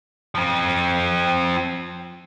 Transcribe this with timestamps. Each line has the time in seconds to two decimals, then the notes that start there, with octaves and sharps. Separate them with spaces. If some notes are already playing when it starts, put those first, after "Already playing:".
0.35 F3 C4